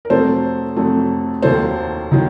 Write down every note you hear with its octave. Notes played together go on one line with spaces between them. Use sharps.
A#4
F2 C3 F#3 A3 A4 C5
F2 C3 F#3 A3
D#2 D#3 F#3 A4 C5
D#3 F#3